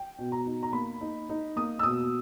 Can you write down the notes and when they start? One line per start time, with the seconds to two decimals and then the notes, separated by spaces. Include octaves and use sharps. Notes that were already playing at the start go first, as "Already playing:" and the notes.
Already playing: G5
0.19 B2
0.32 A#5
0.46 D#4
0.63 A#5
0.73 A#3 B5
1.01 D#4
1.29 D#4
1.56 A#3 D#6
1.79 E6
1.83 B2 D#6